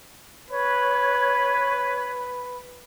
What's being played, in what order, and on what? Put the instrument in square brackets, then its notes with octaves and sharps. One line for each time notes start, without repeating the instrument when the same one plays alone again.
[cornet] B4 [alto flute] C#5